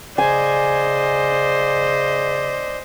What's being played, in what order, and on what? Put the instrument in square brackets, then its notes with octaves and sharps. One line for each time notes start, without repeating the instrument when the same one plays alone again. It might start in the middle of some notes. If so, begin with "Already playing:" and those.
[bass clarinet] C#3 [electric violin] C5 D#5 [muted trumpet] D5 [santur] G#5